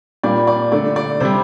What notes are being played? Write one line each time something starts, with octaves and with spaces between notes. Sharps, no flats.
A#2 G3 D5
D5
D3 A3 D5
D5
C3 G3 C5